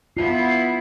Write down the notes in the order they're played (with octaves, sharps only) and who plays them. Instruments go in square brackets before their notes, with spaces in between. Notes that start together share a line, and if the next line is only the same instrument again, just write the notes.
[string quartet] B3 E4 [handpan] F4 [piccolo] C7